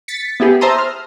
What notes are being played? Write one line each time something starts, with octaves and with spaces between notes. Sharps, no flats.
A6 B6 C#7
B3 E4 G4 G#4
C5 E5 A5 A#5 C6 D#6
F6